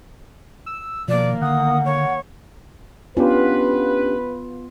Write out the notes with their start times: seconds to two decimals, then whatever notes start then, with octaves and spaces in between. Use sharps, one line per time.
0.66 E6
1.08 B2 D#3 F3 A#3 D5
1.42 D3 F#5 D#6
1.84 C#5
3.17 B3 C#4 D4 F4 G4 B4